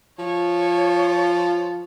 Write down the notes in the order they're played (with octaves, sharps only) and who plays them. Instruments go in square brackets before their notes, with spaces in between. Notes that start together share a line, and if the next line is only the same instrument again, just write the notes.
[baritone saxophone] F3 [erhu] C#5